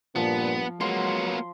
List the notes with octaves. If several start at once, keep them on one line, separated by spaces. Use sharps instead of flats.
G2 A#2 F3 B3
F#3 G#3 A#3 B3 C6